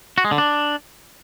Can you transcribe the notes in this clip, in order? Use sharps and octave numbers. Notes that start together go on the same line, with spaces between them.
F#4
G#3
D3
D4